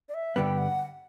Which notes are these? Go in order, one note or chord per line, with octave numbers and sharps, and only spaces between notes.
D5
E5
G2 D3 G3 B3 G5
F#5